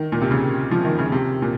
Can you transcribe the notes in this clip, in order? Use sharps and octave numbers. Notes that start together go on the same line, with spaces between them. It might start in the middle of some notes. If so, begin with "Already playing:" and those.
Already playing: D#3
A#2
C3
C#3
F3
D#3
C#3
C3
A#2